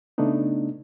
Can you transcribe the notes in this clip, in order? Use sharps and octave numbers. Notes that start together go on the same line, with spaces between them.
C#3 A3 B3 D4 D#4